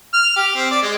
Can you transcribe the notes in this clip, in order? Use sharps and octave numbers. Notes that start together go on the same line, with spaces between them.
F6
G4
C4
D5
G#3